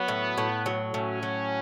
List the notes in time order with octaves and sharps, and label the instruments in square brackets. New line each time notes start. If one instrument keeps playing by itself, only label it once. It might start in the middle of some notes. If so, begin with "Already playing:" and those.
Already playing: [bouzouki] F#3 [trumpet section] B3
[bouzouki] A2
A2
F#3
[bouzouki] A2 [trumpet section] C#4
[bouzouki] F#3